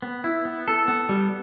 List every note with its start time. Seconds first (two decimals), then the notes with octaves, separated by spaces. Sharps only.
0.02 B3
0.24 E4
0.45 B3
0.68 A4
0.88 B3
1.09 G3